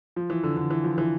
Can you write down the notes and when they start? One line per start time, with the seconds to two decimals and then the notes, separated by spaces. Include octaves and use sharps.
0.16 F3
0.30 E3
0.44 D3
0.57 D3
0.71 E3
0.84 F3
0.98 E3